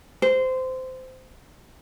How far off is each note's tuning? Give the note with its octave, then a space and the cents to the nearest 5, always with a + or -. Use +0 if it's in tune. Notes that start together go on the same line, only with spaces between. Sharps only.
C5 -20